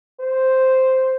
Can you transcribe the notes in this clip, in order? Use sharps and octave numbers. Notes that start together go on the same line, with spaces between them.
C5